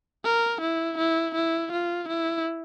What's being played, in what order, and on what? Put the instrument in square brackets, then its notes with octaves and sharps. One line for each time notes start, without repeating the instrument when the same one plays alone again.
[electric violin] A#4
E4
E4
E4
F4
E4